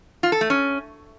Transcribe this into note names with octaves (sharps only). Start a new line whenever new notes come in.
F4
A4
A3
C#4